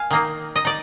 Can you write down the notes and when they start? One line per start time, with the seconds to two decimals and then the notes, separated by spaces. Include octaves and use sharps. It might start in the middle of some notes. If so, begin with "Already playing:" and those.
Already playing: F5 G#5
0.11 D#3 A#3 D#4
0.56 D#5
0.65 D#4 D5